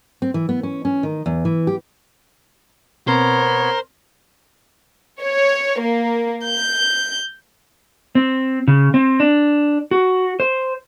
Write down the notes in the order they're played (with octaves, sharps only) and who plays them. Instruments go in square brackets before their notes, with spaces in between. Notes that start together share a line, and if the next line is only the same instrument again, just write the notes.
[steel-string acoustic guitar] C4
E3
B3
C#4
C#4
D#3
E2
E3
G4
[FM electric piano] B2 C4 [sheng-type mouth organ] B3 C#5 [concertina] A#4 [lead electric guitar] C5
[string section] C#5
A#3
G6
[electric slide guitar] C4
C#3
C4
D4
F#4
C5